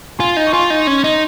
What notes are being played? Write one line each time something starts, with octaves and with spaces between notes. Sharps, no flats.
F4 G#5 C6
D#4
C#6
F4 G#5 C6
D#4
C#4
D#4